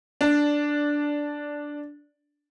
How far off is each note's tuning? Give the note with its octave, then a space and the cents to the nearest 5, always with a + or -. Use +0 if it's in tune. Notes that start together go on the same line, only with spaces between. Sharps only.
D4 -5